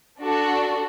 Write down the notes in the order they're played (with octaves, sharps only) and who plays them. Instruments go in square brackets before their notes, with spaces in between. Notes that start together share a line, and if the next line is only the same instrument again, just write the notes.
[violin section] D4 F#4 A4